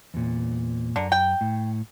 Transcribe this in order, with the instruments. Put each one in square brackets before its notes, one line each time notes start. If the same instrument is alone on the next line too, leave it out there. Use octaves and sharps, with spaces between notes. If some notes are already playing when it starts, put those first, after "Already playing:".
[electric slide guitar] E2 A#2
[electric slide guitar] F#2 A#5 [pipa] D3
[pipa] G5
[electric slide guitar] A2